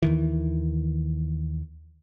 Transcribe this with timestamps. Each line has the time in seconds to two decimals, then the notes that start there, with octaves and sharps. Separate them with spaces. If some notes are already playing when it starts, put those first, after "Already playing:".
0.03 D#2 D#3 E3